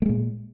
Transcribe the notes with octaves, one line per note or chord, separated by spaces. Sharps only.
A#2 G#3 A3